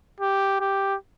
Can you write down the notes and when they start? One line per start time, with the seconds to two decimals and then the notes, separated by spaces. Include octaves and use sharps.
0.21 G4
0.60 G4